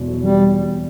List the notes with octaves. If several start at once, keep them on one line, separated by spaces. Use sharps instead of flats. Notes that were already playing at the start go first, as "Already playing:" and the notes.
Already playing: E1 E2 B2
F#3
E2 G3